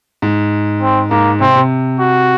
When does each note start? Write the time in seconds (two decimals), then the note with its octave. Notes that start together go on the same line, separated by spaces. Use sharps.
0.22 G#2
0.82 C4
1.11 G#2 A#3
1.40 C3 C4
1.56 C3
1.99 F#4